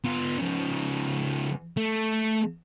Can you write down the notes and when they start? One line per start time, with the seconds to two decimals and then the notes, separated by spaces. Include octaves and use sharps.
0.04 B3 F4
0.38 C#3 F3
1.77 A3